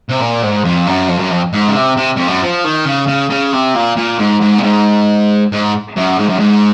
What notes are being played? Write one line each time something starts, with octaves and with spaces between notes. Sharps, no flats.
C3
A#2
G#2
F2
F#2
F2
F#2
F2
G#2
C#3
C3
C3
F2
F#2
F3
D#3
C#3
C#3
C#3
C3
A#2
A#2
G#2
G#2
A#2
G#2
G#2
F#2
G#2
F#2
G#2